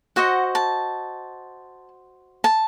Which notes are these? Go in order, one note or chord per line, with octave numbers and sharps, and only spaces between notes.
F#4 C5 D#5 F#5
A5
A5